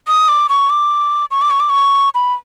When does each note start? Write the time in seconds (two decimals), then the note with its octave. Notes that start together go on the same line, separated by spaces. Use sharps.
0.08 D#6
0.28 D6
0.49 C#6
0.70 D6
1.31 C#6
1.42 D6
1.50 C#6
1.60 D6
1.70 C#6
2.15 B5